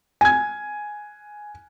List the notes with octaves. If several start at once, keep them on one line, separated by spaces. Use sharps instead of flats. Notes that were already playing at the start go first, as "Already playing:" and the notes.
G#5 G#6